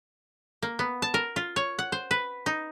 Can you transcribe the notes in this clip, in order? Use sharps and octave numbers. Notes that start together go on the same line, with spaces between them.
A#3
B3
A5
A#4
F4
C#5
F#5
C5
B4
D#4